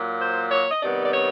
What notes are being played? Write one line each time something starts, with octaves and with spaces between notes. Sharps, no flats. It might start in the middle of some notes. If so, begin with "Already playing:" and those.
Already playing: A#2 F#3 A#3
C5
C#5
D#5
C3 D#3 G3 B3 D5
D5
C#5